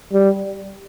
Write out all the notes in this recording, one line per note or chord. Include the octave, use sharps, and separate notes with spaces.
G3